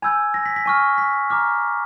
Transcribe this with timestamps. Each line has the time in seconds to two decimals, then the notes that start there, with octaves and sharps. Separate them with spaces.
0.02 G#5 B5 E6 G6 G#6
0.34 A#6
0.46 B6
0.56 B6
0.66 G#5 C#6 F6
0.98 B6
1.30 A#5 D6 F6